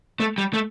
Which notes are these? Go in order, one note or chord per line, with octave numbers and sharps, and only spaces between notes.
A3
G3
A3